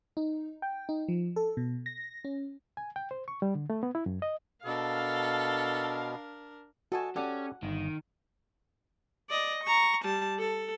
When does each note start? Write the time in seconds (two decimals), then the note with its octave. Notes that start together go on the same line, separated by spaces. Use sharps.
0.17 D#4
0.62 G5
0.89 D#4
1.08 F3
1.36 A4
1.57 B2
1.86 A#6
2.24 C#4
2.77 G#5
2.96 G5
3.11 C5
3.28 C#6
3.42 G3
3.55 D3
3.70 A3
3.83 B3
3.95 E4
4.06 F#2
4.22 D#5
4.65 B2 D4 A4 A#4 F5
6.92 F#4 A4 D#5 G#5 A5
7.16 C#4 G4 A4 D5 F#5
7.63 G1 D#3
9.30 D5 D#5
9.64 A#5 C#6
10.05 G3 A5
10.39 A4